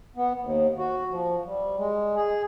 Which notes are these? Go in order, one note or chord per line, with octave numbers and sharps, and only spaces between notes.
B3
D#2
F#4
F3
G3
G#3
G#4